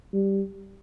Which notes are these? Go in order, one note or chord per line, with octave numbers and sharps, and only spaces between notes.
G3